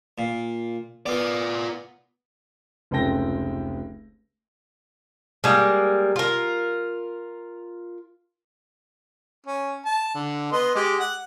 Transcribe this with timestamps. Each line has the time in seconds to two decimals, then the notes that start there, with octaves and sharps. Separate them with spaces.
0.18 A#2
1.06 B3 F4 D5
2.91 F1 C#2 C4 A4 G5 A#6
5.44 G3 G#3 A#3
6.16 F4 A#4
9.46 C#4
9.85 A5
10.15 D3
10.52 B3 D#5 C6
10.75 G#3 G4
10.99 F#5